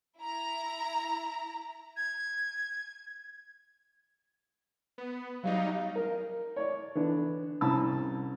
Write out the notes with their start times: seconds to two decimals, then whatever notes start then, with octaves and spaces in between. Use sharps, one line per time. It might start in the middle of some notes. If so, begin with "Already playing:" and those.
0.20 E4 A#5
1.96 G#6
4.98 B3
5.44 F#3 G3 D#4 F5
5.96 A#4
6.56 C#5 D5
6.95 D3 E3 B3 D4
7.61 C2 C#4 A5 B5 E6